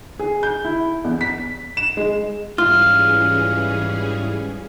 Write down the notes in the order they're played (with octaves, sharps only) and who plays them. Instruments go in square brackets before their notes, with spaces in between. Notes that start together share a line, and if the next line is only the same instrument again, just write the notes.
[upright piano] G#4
G6
E4
E2
B6
E7
G#3
[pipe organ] G#2 G3 [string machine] E3 C#4 G#4 [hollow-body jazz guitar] F4 [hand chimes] F6